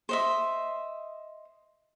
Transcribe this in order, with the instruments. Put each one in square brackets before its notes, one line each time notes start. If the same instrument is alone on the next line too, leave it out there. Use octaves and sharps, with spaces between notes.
[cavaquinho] C5 D#5 E5